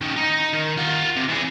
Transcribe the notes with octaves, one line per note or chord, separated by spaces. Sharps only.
D#3 C#4
D#4
D#3
F4 F#5
C3
E3 G#4